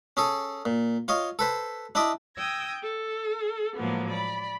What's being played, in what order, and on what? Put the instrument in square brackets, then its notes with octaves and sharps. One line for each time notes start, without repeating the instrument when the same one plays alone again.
[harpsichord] C#4 G#4 A4
A#2
F4 C#5 D#5
A4 B4 C5
D4 E4 D5 D#5
[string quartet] G5 D#6 E6 G#6 A#6
A4
A2 F3 F#3 G#3 A#3 B3
D5 B5